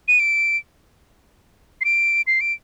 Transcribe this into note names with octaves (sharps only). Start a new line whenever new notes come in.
D#7
D7
C7
D7
C7
D7